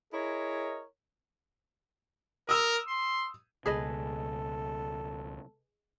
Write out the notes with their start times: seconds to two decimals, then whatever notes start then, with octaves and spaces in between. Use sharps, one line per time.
0.12 E4 G#4 A#4 C#5 D#5
2.49 A#4 D#6 E6
2.88 C6
3.66 C#2 B2 G#4 A4 B4 D#5